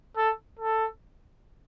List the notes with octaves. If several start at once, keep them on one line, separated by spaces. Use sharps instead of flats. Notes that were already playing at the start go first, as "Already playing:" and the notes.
A4
A4